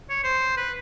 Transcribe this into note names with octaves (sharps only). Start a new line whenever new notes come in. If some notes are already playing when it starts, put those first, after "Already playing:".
C#5
C5
B4